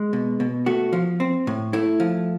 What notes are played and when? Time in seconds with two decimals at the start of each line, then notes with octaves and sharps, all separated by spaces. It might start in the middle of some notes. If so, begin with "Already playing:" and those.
Already playing: G#3
0.13 B2
0.40 B2
0.66 A3 F#4
0.93 F3
1.20 C4
1.47 A2
1.73 A3 E4
2.00 F3